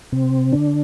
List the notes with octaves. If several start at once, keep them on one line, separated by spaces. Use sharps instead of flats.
C3 C4
D3 D4